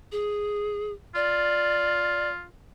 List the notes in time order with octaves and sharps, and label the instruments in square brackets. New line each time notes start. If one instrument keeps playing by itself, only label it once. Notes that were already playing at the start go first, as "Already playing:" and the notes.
[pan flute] G#4
[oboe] F4 [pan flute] D5